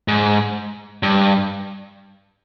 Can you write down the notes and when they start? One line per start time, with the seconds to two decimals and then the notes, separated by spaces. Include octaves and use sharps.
0.08 G#2
1.03 G2